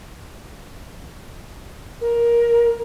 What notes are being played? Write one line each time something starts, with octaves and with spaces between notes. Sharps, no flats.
A#4